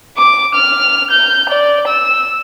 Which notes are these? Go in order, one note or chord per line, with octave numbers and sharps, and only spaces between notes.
D6
F6
G6
D5
E6